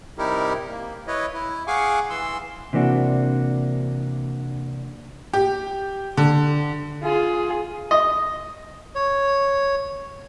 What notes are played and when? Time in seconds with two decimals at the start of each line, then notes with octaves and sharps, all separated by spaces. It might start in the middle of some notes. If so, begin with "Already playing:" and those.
0.18 C3 G3 D#4 E4 G4 A#4
0.70 A#3
1.07 E4 B4 C#5 D#5
1.33 E4
1.67 G#4 F5 F#5 G#5 C#6 D6
2.10 E3 C6 E6
2.73 C3 E3 A#3 D4 F#4
5.33 G4
6.17 D3
7.03 F4 G#4
7.91 D#5
8.95 C#5